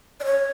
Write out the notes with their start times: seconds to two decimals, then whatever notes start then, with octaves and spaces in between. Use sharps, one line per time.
0.20 D5
0.25 C#5